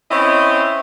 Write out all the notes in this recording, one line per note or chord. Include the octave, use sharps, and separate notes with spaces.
C4 C#4 E4 C5 D#5